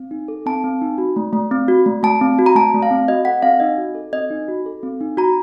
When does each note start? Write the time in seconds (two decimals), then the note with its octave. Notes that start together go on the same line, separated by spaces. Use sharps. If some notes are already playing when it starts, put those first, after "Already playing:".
Already playing: C4
0.11 D#4
0.28 A4
0.46 C4 A5
0.64 C4
0.82 D#4
0.98 F#4
1.16 A3
1.33 A3
1.51 C4
1.68 F#4
1.86 A3
2.03 A3 A5
2.21 C4
2.39 F#4
2.46 A#5
2.55 A3 A5
2.74 A3
2.82 F5
2.91 C4
3.08 F#4 D#5
3.25 A4 F#5
3.42 C4 F5
3.60 D#4 D#5
3.78 F#4
3.95 A4
4.13 C4 D#5
4.30 D#4
4.48 F#4
4.66 A4
4.83 C4
5.01 D#4
5.17 F#4 A#5